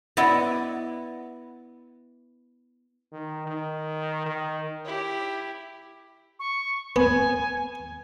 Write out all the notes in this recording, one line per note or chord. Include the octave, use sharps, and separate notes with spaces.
B3 E4 D5 D#5
D#3
D#3
D#3
E4 G4
C#6
B3 G#5